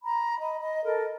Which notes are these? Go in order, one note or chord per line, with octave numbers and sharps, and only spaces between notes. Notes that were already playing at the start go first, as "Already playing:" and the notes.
A#5 B5
D#5 B5
D#5
A4 A#4 D#5